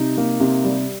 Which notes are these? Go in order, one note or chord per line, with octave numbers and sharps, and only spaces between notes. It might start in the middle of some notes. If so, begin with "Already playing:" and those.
Already playing: C3 G3 D#4
A#3
C3
G3